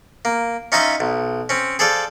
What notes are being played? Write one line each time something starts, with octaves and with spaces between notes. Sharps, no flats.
A#3
C#4 D#4 F4 D#5 E5 B5
B1
C4 C#4
G#4 A4 C5 D5 F5